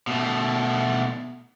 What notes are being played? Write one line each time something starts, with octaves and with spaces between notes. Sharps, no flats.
B2 A3